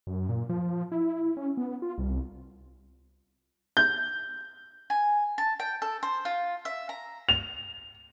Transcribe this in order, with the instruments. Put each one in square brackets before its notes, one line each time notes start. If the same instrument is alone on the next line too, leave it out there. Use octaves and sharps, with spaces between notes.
[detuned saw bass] F#2
A#2
F3
E4
C#4
B3
F4
C2
[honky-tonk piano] G6
[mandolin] G#5
A5
G5
A4
C5
F4
E5
A#5
[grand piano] F7